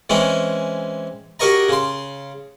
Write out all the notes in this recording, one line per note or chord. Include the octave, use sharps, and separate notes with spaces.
E3 G#3 C4 C#4
F#4 G4 A#4 C#5 D#5 A#5
C#3 C6